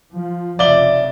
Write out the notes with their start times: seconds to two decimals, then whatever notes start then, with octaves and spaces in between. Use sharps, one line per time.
0.12 F3
0.59 F1 C#3 F3 D5 E5 G7